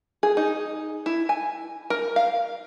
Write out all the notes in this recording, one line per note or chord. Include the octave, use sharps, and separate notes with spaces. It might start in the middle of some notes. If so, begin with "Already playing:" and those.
G#4
D#4
E4
G#5
A#4
F5